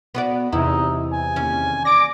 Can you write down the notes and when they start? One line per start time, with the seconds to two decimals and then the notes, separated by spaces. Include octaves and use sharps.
0.15 B3 F#4 D5
0.53 E2 C3 D#4 E4
1.13 G#5
1.36 D#2 C#4
1.85 D5 D6 A#6 D7